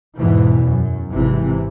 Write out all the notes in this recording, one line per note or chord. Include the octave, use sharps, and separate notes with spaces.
E2 G#2 B2 E3
F#2
G#1 C3 E3